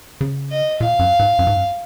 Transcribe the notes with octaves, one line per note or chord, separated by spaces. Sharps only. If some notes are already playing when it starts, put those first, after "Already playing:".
C#3
D#5
A#2 F5
F#2
G#2
F#2
G#2
F#2